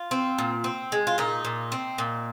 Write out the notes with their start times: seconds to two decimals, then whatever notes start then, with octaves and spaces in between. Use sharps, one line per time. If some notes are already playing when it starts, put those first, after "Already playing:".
Already playing: F4
0.11 C4
0.38 A#2
0.64 C4
0.92 G#3
1.07 F4
1.18 A#2 D#4
1.45 A#2
1.72 C4
1.98 A#2